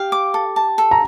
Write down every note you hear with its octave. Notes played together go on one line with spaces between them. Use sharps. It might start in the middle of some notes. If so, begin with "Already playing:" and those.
Already playing: G4 F5 G5
D6
A4
A5
A4
A#5